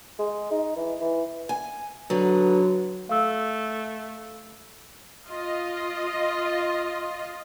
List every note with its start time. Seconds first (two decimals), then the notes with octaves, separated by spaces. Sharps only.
0.19 G#3
0.51 D#4
0.76 E3
1.01 E3
1.49 G#5
2.10 D3 F#3 D#4 B4
3.09 A3 F5 E6
5.27 F4 D#5